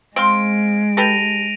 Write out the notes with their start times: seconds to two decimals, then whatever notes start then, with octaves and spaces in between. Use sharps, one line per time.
0.16 G#3 C4 F5 C6 D7
0.97 G4 A4 B4 A#6 D#7 F7